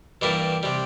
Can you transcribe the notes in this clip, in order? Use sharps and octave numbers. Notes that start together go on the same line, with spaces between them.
G2 E3 G3 A#3 E4
C3 G3